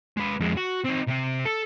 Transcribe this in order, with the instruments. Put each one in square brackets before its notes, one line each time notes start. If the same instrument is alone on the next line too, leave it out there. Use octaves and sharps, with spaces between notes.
[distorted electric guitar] G#3 B4
F2 G#3
F#4
C4 D#4
C3 C4
A4